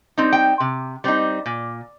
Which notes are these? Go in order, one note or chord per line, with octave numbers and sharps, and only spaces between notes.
G3 C4 D#4
G5
C3
G3 C4 D#4
A#2